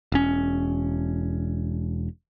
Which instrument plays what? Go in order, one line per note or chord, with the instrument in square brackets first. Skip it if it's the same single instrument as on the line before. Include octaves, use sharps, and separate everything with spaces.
[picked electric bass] E1 C#4